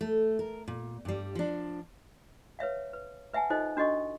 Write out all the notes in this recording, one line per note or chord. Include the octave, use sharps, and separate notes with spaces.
A3
A#4
A#2
G2 G3
F3 D4
B4 C#5 E5 F5
B4
B4 E5 F#5 G#5 A5
D#4 F4 A4 C5 D#5
D4 F#4 A4 D#5 C#6